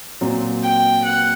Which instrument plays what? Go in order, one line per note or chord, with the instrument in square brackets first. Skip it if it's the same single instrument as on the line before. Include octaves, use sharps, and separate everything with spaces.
[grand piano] A#2 F#3 C4
[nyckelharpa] G5
F#5